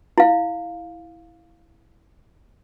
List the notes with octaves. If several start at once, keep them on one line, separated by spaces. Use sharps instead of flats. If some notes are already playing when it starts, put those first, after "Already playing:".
E4 F5